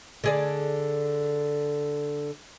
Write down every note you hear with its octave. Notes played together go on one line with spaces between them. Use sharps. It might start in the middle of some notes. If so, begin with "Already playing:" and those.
D3 G#4 D5